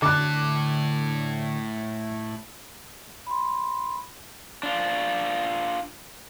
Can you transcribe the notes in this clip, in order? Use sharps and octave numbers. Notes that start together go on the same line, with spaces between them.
A2 D3 A5 D6 F#6
B5 C6
D4 F4